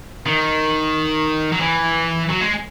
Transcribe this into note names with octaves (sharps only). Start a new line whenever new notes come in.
D#3
F#3
E3
F#3
G#3